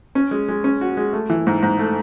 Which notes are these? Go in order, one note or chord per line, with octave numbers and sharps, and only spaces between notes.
C#4
G#3
G#3
C#4
F#4
G#3
A3
E3
G#2
G#2
A3